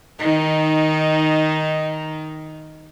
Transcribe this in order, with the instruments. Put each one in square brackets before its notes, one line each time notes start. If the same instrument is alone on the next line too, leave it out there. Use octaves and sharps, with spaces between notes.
[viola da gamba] D#3 D#4